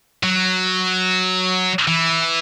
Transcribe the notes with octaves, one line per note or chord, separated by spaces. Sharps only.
F#3
E3